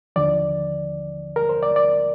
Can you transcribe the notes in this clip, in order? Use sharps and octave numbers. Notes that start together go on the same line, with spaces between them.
D#2 D3 F3 D5
A#4
C5
D5
D5